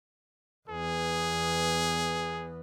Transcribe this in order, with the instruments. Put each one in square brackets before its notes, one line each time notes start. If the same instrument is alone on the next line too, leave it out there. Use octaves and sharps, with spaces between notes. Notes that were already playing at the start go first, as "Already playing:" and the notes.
[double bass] E2 B3 [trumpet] G#4